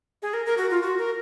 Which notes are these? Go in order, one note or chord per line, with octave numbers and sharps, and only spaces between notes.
G#4
A#4
A#4
F#4
F4
F#4
A#4